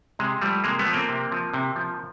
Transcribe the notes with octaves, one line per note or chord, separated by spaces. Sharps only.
C3 G#3
F3 G3 A3
C3 G#3 A#3
A3 B3
F3
A#3 C4
C3
F3
C3
F3